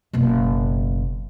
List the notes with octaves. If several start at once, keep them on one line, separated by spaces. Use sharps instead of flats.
F#1 B2